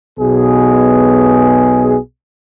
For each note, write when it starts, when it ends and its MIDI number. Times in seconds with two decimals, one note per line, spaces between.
0.19 1.97 35
0.19 1.97 47
0.19 1.97 68